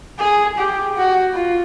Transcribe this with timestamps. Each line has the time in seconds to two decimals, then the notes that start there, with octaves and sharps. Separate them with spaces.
0.19 G#4
0.58 G4
0.96 F#4
1.35 F4